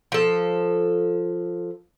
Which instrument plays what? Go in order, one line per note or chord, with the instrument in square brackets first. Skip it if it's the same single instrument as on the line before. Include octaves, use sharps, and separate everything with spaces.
[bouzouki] F3 A4